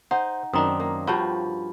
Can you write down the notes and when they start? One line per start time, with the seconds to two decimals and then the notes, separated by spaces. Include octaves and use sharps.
0.11 D#4 C5 F#5
0.53 F#2 D#3 C4 D4 D#4 A#5 D#6
0.80 A#3
1.07 G2 F3 F#4 C#5 G5 B5